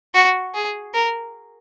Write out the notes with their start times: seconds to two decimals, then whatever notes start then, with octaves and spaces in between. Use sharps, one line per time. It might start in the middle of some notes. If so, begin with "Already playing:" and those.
0.14 F#4
0.54 G#4
0.94 A#4